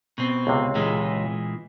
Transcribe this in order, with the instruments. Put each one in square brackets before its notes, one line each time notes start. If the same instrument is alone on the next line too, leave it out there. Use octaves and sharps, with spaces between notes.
[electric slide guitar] B2 C4
[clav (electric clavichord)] C#2 C3
[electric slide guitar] A#2 E3 G#3